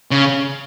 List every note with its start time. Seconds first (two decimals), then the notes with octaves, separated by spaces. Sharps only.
0.11 C#3